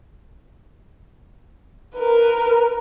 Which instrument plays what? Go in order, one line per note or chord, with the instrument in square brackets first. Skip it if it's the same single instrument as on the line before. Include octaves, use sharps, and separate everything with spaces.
[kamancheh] A#4 B4